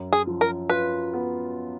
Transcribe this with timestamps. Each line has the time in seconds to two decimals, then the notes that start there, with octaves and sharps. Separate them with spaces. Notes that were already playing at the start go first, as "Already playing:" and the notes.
Already playing: F#2
0.13 G#4
0.27 F3
0.41 A#4
0.70 F4 B4
1.14 B3